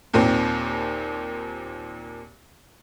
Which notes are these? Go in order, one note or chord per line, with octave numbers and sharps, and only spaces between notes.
D#2 A#2 C4